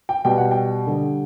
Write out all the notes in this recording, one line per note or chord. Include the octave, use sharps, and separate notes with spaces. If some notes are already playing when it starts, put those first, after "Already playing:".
G5
B2 G3 G5
F#5
G5
D3 G3